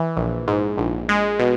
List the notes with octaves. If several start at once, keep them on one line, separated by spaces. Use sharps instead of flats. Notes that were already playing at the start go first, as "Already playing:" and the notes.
Already playing: E3
A#1
G#2
A#1
G#3
B2